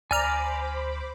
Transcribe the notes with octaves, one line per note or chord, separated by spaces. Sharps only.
D2 C5 D5 G#5 A#5 B5 D6 F6